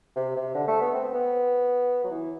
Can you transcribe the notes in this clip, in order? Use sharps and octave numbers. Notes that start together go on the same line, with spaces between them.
C3
C3
D3
A3
B3
C4
B3
F#3
E3